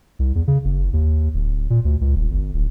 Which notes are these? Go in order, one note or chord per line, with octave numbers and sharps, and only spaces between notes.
C2
E2
C#3
F#1
D#2
D1
A#2
D2
C#2
D#1
G1
D1